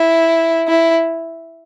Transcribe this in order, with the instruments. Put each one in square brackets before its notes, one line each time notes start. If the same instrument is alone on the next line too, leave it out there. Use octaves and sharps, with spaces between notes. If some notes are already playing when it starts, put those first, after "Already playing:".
Already playing: [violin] E4
E4